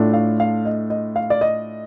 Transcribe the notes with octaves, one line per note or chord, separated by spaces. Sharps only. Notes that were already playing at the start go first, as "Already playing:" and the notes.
Already playing: A2 A3 D4 F4
F5
F5
D#5
D#5
F5
D5
D#5